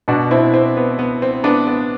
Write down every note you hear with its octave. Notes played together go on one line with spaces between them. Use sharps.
B2 D4 F#4
C4 E4
C4
B3
B3
C4
B3 D4
B3